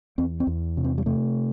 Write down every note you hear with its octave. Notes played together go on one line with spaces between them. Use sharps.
E2 C4
C4
E2
C3
C4
G3
C3 A3